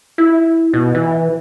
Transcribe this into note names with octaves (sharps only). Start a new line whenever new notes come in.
E4
B2
E3